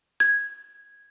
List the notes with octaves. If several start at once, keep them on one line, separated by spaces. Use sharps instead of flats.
G#6